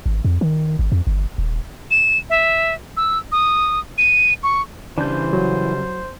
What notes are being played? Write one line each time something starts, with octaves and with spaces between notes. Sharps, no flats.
G#1
F2
D#3
G#1
F2
G1
D#1
E7
E5
E6
D#6
D#7
C#6
C#3 E3 G3 D4 C5 G6
F#3